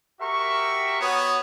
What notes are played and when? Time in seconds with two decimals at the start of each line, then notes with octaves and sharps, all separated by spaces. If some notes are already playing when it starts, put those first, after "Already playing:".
0.20 F#4 G4 A#4 E5 G5 C#6
1.00 B3 F#4 B4 C#5 D#6